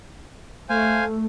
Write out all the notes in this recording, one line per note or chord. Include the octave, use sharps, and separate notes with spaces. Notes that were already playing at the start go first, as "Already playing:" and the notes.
A3 C5 F5 G#5